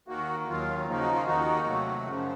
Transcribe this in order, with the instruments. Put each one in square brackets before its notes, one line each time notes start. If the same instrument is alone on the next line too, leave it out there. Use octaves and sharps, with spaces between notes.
[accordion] D#2 D#3 A#3 F#4
D#2 D#3 F#3 F4
C#3 F3 A#3 D#4
F#4
F4
D#2 D#3 A#3 D#4 F#4
C3 F#3 A3
F#2 C#3 F3